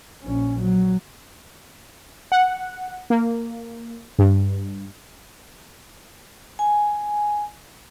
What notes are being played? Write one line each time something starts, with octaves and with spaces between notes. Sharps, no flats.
A#1 C#4
F#3
F#5
A#3
G2
G#5